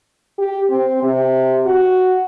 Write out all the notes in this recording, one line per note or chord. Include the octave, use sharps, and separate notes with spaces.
G4
C4
C3
F#4